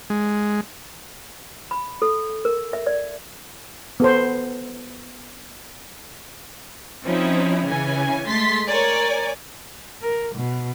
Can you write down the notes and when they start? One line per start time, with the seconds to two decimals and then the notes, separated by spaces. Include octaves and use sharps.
0.10 G#3
1.71 B5
2.02 A4
2.45 A#4
2.73 E5
2.87 D5
4.00 B3 A4 C5
7.03 F3 C4 C#4 D#4 E4
7.67 C#3 E3 C#4 G#5
8.28 G#3 A3 C6 A6 B6
8.66 A#4 C#5 D5 G#5
10.01 A#4
10.35 B2